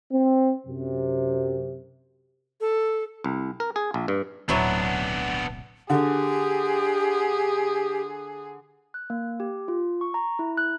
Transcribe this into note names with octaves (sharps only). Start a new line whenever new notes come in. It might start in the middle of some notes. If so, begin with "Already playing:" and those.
C4
F#2 C3
A4
C2
A#4
G#4
A#1
G2
D1 B1 F#3 B3 D4 E4
D3 G4 G#4
F#6
A#3
G4
F4
C#6
A#5
E4
F#6